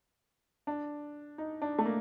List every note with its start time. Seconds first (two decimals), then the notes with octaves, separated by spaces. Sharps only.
0.67 D4
1.38 D#4
1.62 D4
1.78 A3
1.86 A#3